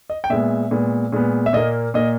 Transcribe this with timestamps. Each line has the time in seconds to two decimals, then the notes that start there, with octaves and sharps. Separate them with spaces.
0.10 D#5
0.24 G5
0.30 A#2 G#3 B3 E5
0.71 A#2 G#3 B3
1.12 A#2 G#3 B3
1.46 E5
1.53 A#2 A#3 D#5
1.94 A#2 A#3 D#5